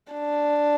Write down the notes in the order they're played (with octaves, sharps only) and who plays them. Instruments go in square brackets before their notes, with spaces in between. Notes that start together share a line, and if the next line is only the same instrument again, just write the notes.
[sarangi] D4